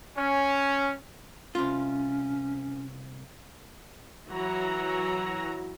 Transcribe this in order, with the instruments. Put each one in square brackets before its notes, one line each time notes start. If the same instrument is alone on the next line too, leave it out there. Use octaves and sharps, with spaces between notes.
[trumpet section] C#4
[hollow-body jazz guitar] C2 F4 [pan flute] C#4
[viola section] E3 F#3 F#4 A#5